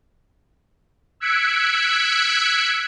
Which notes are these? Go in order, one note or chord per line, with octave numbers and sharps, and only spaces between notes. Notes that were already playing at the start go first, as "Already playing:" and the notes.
E6 F#6 G#6 B6 C#7 D7